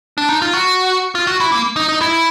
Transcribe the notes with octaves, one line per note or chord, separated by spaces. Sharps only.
D4
D#4
F4
F#4
F4
F#4
E4
A#3
D#4
D#4
E4